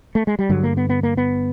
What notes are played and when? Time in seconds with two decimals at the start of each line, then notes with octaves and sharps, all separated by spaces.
0.15 A3
0.27 G#3
0.39 G3
0.49 G2 D3 F#3
0.63 A#3
0.77 B3
0.90 B3
1.03 A#3
1.17 B3